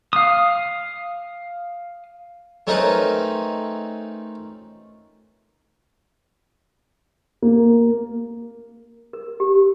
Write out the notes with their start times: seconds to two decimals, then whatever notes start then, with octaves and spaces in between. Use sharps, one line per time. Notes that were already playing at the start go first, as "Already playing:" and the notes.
0.13 F5 D#6
2.67 A3 C4 C#4 D#4 A#4 B4
7.42 A#3
9.13 A#4
9.40 G4